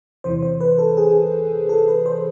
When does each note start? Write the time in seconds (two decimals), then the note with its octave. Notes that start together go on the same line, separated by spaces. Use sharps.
0.24 E2 C3 E3 C5
0.42 C5
0.61 B4
0.79 A4
0.97 G#4
1.69 A4
1.88 B4
2.06 C5